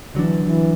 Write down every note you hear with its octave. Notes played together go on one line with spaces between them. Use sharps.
D3 E3 F#3 D4
E3